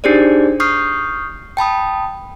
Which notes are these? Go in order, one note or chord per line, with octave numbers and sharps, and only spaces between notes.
D4 D#4 G4 G#4 C5 D5
C#6 D#6 F6 G6 C7
G5 A5 B5 D#6